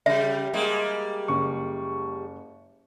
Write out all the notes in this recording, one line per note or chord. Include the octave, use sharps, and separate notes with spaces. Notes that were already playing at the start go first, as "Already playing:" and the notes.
C#3 G3 E5
G3 G#3 A#3
F#1 C#6